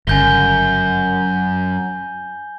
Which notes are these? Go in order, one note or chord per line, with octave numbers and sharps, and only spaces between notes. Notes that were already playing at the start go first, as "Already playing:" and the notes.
G1 F#2 C#3 G#5 G6 G7